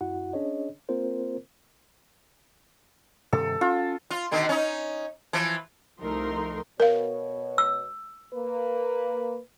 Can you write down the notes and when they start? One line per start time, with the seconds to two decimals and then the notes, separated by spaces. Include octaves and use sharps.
0.01 F#2 E4 F#4 F#5
0.33 C#4 D4 G#4 C#5 D#5
0.89 A#3 C4 F4 A#4 C5
3.33 G2 C3 D#3 A4
3.61 C#4 F4
4.11 F4
4.31 B2 D3 D#3
4.49 C#4 D#4
5.33 E3 F3
5.99 C2 F3 A3 D#4 A#4 C6
6.80 B2 A#4 C#5 F5
7.58 E6
8.34 A#3 B4